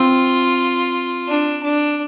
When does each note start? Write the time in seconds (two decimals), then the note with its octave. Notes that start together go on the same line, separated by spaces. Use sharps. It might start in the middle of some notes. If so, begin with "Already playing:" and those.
Already playing: C4 F4
1.28 D4
1.63 D4